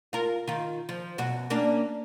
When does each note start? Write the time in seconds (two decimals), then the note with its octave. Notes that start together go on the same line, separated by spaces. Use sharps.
0.13 F4 A#4
0.48 D#3 F4
0.89 F3
1.18 F#2 B2 F#4
1.50 A#3 C#4 D4